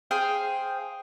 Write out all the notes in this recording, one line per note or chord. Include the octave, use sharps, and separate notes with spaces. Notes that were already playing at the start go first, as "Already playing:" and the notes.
G#4 C5 F5 G5